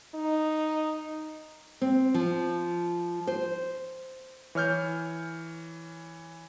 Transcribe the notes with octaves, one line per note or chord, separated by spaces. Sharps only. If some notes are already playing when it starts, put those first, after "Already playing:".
D#4
C4
F3
C5
E3 C#5 F6 G6